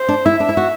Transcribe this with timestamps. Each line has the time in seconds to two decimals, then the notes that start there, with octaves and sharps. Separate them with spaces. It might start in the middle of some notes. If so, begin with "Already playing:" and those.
Already playing: C5
0.09 D4
0.25 E4 E5
0.40 D4
0.49 E4
0.57 F#4